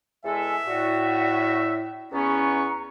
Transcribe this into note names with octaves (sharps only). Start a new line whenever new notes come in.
E2 G#3 A4 E5 G#5
A2 F#4 D5
E2 B3 C#4 A#5 C#6